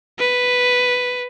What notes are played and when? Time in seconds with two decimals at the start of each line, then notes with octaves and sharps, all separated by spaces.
0.19 B4